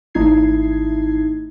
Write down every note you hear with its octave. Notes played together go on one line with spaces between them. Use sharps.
G#1 A3 D#4 E4 G#6 C7